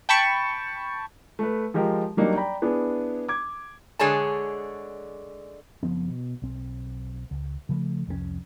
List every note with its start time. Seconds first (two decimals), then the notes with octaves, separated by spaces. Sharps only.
0.09 G5 A5 B5 C#6
1.39 A3 B4
1.74 F3 G#3 G4 A#4
2.17 F#3 G3 A#3 D4 D#4
2.34 D5 G5 A#5 B5
2.62 B3 D4 E4 G#4
3.29 D6 G#6
3.99 D3 G#3 G#4 C#5 D5 A5
5.83 F#1 F3 B3 C4
6.08 B2
6.42 B1 C4
7.31 C#2
7.69 C#3 F3 F#3 A3
8.07 C2 F2 G3 C#4